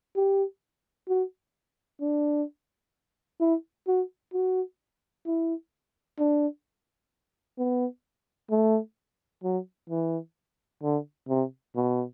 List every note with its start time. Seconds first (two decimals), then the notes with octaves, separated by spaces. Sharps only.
0.16 G4
1.09 F#4
2.01 D4
3.40 E4
3.88 F#4
4.33 F#4
5.26 E4
6.19 D4
7.58 B3
8.51 A3
9.44 F#3
9.90 E3
10.83 D3
11.29 C3
11.76 B2